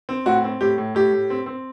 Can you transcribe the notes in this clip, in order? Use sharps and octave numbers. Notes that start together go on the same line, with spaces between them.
C4
A2 F#4
C4
A2 G4
A2
A2 G4
A2
C4
C4